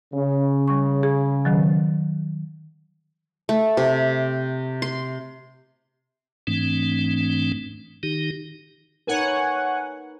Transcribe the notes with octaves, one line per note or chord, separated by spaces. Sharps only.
C#3
G3 C#6
G#4
D#3 F#3
A3
C3
C6
G#2 E3 A3 C4 D4
D#3 D#4 G4
D#4 A#4 B4 C#5 F#5 G#5